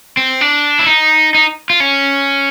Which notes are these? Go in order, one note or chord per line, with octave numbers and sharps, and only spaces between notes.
C4
D4
E4
D#4
D#4
F4
C#4